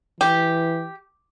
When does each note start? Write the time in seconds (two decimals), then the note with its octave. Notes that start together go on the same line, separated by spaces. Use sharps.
0.21 E3 G4